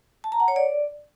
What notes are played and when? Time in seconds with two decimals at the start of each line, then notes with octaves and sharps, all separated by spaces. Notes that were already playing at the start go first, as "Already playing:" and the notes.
0.24 A5
0.32 A#5
0.40 F#5
0.48 C#5
0.56 D5